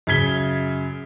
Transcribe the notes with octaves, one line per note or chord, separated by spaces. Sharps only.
F#2 C#3 G#6 B6 G7